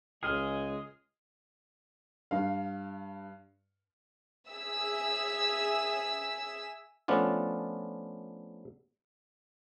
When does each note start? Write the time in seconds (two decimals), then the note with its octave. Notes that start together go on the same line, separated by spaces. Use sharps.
0.23 C#2 G#3 G#4 D#5 F6
2.31 G2 F5
4.49 G#4 E5 E6
7.08 F3 A3 B3 C#4 D4 F4